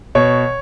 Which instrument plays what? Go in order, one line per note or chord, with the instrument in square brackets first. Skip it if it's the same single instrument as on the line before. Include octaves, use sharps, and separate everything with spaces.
[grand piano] B2 C#5